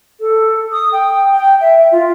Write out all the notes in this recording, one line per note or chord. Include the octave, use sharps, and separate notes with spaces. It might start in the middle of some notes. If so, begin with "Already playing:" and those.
A4
D#6
G5
G5
E5
F4